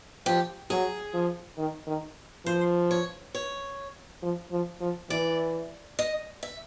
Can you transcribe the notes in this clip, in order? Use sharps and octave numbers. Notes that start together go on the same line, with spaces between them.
F3 G4
F#3 G#4
F3
D#3
D#3
F3 C5
C#5
C#5
F3
F3
F3
E3 D5
D#5
E5